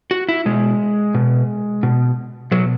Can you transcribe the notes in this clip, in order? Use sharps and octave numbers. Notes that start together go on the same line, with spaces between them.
F#4
E4
B2 G#3
B2
B2
B2 F#3